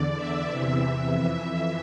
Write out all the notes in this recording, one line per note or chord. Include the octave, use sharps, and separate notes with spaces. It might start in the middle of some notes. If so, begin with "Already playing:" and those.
Already playing: E2 D3 D5
E5
E2 C3 E3
F2 E3